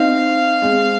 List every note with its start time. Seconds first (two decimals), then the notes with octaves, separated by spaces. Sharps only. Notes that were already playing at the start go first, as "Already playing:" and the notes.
Already playing: C4 D#4 F5
0.62 G#3 C4